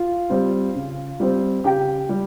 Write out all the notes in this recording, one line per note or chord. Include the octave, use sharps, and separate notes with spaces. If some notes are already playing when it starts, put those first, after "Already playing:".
Already playing: F4 F5
G3 C4
C#3
G3 C4
C#3 G4 G5
G3